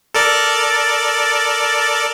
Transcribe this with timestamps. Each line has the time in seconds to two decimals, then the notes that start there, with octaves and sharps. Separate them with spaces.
0.15 A4 A#4 D5